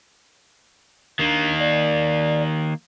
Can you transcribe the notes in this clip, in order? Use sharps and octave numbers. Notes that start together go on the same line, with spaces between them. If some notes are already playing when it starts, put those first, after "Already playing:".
D#3 A#3 D4
D5